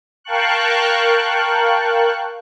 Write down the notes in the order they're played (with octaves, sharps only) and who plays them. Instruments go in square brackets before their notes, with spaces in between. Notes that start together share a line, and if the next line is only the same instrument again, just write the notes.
[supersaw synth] A#4 F5 G5 A5 C#6 F#6